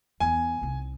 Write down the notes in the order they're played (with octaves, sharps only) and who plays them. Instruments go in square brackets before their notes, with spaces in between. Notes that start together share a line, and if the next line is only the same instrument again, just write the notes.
[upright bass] E2 [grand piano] G#5
[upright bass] C2 D#4